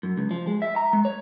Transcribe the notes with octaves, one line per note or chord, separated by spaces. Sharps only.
F#2
C#2
F3
G#3
E5
A#5
G#3
C#5